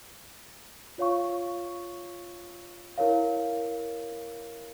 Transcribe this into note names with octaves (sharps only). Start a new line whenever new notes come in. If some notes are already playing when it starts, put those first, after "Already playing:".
F4 C#5 F5 C#6
E4 A#4 C#5 F5